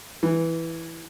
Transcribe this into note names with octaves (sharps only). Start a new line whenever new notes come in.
E3